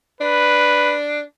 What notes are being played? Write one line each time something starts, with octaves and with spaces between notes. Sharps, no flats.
D4 B4